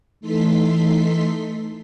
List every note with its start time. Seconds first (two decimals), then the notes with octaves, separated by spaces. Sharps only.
0.20 E3 A3 D#4 A4 C6 B6